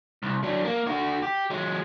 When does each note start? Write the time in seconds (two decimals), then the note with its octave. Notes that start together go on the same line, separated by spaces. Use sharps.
0.23 C2
0.43 F#3 D4
0.65 A#3
0.87 D3 F#4
1.22 G4
1.50 F#3 G#3